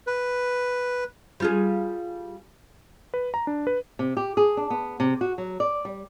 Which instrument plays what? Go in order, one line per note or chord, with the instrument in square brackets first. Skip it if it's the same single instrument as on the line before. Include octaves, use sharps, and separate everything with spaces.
[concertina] B4
[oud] G3 F4 G#4
[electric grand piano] B4
A#5
D4
B4
[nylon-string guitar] C3
G4
G#4
D4
B3
C3
F#4
F#3
D5
G3